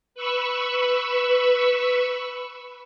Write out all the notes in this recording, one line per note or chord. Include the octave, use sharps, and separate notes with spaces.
B4 B5 C#6 E6